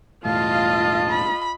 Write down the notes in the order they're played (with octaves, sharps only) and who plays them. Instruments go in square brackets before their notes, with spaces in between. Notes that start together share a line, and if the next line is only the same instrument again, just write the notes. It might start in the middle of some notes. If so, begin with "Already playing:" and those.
[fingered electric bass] E1 A2 [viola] F4 D#5 [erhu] F5 [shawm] A5
[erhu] B5